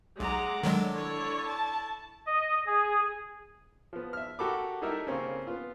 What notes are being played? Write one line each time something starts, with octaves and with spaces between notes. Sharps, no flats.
B1 G#3 F#5 A#5 D6
D3 D#3 F#3 G#3
E4 C#5 C#6
A5
D#5
G#4
F3 B3
E5 F6
F#4 G4 A4 A#4 B5 D6
G3 D#4 E4 A4 A#4 E5
C#3 A#3 C4 C#4
B3 F4